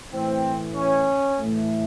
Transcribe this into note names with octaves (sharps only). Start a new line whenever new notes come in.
A2 E3 A3 C4
C#4
A2 E3 A3